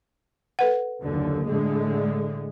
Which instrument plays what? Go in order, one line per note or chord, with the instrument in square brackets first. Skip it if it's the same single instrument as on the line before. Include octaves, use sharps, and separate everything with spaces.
[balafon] A4 B4 F#5
[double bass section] F#1 D#2 D3
A2 D3 G#3